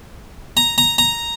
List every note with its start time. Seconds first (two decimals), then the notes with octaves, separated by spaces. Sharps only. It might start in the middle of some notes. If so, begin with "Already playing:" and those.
0.57 A#5
0.78 A#5
0.98 A#5